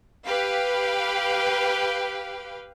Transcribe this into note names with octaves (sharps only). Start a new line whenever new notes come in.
G4 B4 F5